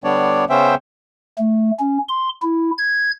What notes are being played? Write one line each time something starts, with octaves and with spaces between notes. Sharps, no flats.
D3 G3 B3 D4 C#5 D5
C#3 B3 C#4 C5 E5 G5
A3
C#4
C6
E4
G#6